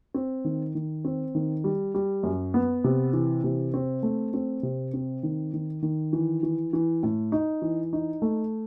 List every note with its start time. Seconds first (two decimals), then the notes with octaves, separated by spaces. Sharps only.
0.14 C4
0.45 D#3
0.75 D#3
1.05 C4
1.35 D#3
1.64 G3
1.94 G3
2.23 F#2
2.54 B3
2.84 C3
3.13 E3
3.44 C3
3.74 C4
4.03 A3
4.34 C4
4.63 C3
4.93 C4
5.23 D#3
5.54 D#3
5.82 D#3
6.13 E3
6.43 E3
6.73 E3
7.03 A2
7.32 D#4
7.62 E3
7.93 D#4
8.22 A3